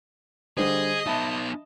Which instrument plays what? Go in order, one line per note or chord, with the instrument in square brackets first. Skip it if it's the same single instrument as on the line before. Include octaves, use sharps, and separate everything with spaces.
[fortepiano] D3 G3 C5 [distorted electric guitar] G#4 [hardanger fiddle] D#5
[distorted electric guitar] B3 D#4 [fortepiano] E5 A5 B5